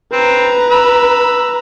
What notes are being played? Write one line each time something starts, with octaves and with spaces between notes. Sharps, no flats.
C4 B4 A#5
B5 E6